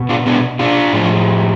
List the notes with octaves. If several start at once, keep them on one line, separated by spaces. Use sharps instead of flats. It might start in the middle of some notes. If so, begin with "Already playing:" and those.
Already playing: B2
D4 F4
B3 D4
D4 F4
A2 F3